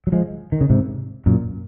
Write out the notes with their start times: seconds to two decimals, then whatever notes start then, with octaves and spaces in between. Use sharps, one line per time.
0.07 F#3
0.12 F3 G#3
0.52 D#3
0.61 C#3
0.70 G#2 C3
1.26 F#2 A#2